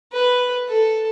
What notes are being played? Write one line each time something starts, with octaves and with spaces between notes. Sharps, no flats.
B4
A4